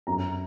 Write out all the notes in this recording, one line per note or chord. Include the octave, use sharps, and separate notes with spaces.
F#2 A#5